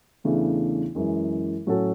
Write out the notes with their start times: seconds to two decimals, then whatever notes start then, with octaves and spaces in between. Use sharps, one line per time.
0.24 E2 C#3 E3 A3 D4
0.95 F#2 E3 G#3
1.66 A2 F#3 C#4 F#4 A4